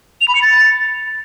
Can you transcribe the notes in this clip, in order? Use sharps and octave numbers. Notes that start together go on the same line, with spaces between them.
F7
B5
C#7
A6